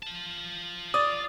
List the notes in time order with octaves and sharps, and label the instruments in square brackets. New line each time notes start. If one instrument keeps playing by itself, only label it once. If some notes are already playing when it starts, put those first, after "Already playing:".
[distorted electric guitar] F4 A5
[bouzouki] D5 [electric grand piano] D#6 A6